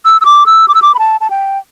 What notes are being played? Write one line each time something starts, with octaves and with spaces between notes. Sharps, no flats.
E6
E6
D6
E6
D6
E6
D6
B5
A5
A5
G5